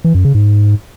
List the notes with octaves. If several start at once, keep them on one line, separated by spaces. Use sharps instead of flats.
E3
F#2
C#3
G#2